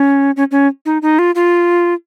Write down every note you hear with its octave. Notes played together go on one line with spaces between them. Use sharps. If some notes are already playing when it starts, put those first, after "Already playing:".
Already playing: C#4
C#4
C#4
D#4
D#4
F4
F4